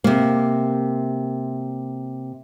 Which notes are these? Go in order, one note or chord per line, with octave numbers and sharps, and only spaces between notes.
C3 A#3